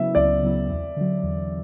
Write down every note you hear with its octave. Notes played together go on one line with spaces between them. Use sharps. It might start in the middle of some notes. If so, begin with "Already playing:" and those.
Already playing: C#3 F#3 B3 E4 E5
C#2 D5
C#3 F#3 B3 E4
E2
D3 F#3
E2